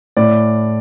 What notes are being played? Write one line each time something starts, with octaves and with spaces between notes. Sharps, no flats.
A2 D5